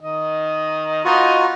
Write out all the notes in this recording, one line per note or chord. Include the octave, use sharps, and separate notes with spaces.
D#3 D#5
B3 D#4 F4 F#4 D#5